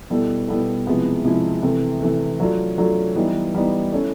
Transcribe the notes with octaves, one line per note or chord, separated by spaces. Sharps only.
B2 G3 B3 E4 A4
B2 G3 B3 E4 A4
C3 F3 G#3 B3 E4
C3 F3 G#3 B3 E4
C3 E3 A3
C3 E3 A3
F#3 A3 D4 F4
F#3 A3 D4 F4
E3 G3 B3 D#4
E3 G3 B3 D#4
A3 C#4 E4